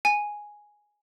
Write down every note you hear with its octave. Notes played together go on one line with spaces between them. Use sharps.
G#5